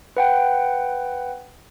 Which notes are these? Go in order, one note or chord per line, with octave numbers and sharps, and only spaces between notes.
B4 F#5 G5